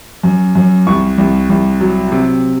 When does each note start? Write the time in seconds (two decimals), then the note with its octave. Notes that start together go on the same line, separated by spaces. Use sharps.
0.23 F#2
0.55 F#2
0.87 C2 C#6
1.18 C2
1.49 C2
1.81 F#3
2.12 C3